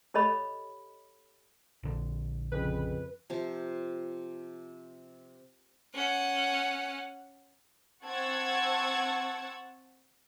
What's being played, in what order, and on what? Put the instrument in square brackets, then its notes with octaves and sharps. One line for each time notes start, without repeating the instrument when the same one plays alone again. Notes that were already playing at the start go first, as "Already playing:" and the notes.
[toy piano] G4 A4 C#5 D#5 B5
[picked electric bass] A#1 D3
[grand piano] F2 C#3 [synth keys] B4
[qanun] C3 F3
[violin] C#4 F#5
[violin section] C4 F#5 A5 C#6 E6 G#6